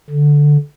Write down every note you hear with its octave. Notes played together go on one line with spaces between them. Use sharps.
D3